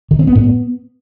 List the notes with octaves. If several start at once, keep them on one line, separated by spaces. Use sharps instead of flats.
D#3
C4
B3
A2
B3